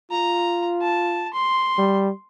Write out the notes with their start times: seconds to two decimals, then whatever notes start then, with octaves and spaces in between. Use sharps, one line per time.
0.11 F4 A#5
0.82 A5
1.33 C6
1.78 G3